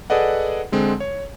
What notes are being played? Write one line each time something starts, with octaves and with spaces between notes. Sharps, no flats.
G#4 A4 B4 D5 D#5 F#5
D3 G#3 C4
C#5